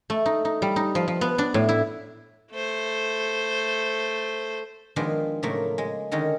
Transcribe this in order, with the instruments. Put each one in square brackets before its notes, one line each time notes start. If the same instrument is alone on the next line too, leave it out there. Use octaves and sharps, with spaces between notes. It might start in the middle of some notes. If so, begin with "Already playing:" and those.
[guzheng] A3
D#4
D#4
G3
D#4
F3
F3
B3
D4
A2
E4
[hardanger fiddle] A3 C5
[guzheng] D#3 F3 G#3 B3 D4 C5
A2 C#3 F3 F#3 A3 A#3
G#3
D3 D#3 G#3 C#4 D#4